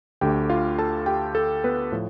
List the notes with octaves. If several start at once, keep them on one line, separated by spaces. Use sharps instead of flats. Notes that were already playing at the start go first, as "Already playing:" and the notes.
D2 D3 A3 G4 G5
F4 F5
A4 A5
G4 G5
A4
B3 B4
A2 F3